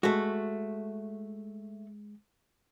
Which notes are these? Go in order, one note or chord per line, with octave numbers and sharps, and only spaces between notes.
G#3 A3 F#4